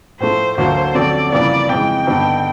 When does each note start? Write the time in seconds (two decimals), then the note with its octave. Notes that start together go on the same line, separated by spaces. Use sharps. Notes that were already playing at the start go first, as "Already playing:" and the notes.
0.20 A2 F3 A3 C5
0.58 D2 D3 F#3 A#3 C5
0.95 F2 D3 F#3 A3 C4 D5
1.32 F2 C#3 E3 G3 A#3 D5
1.69 F2 C#3 E3 G#3 G5
2.07 G2 D3 G3 B3 D#4